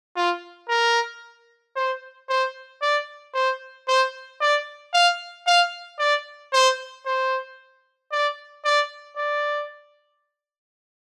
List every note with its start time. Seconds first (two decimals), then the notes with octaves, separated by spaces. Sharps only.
0.16 F4
0.69 A#4
1.76 C5
2.29 C5
2.82 D5
3.34 C5
3.88 C5
4.41 D5
4.93 F5
5.47 F5
5.99 D5
6.53 C5
7.06 C5
8.12 D5
8.65 D5
9.17 D5